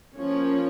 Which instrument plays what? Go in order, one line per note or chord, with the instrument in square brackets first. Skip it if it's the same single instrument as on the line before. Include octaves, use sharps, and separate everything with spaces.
[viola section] F3 A#3 C#4 C#5